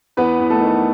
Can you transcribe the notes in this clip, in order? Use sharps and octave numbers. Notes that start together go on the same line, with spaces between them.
E2 B3 B4
E2
A3 A4
D#3